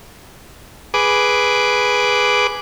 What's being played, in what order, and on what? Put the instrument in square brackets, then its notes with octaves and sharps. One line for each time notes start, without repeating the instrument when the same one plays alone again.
[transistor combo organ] G#4 B4 D6